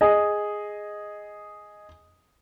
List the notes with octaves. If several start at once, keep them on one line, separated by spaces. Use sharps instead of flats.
G#4 D#5